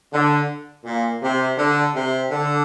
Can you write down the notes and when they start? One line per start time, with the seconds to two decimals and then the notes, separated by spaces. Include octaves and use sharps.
0.13 D3
0.84 A#2
1.21 C3
1.57 D3
1.94 C3
2.30 D3